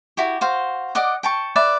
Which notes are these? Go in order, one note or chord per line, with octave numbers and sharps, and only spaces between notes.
E4 F#4 G4
F#4 C5 F5
D5 D#5 F#5 D6
G5 A5 C#6
B4 D5 E5